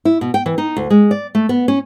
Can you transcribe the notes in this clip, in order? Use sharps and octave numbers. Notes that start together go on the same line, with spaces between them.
E4
B2
G5
E3
D#4
D2
G#3
D5
A3
B3
C#4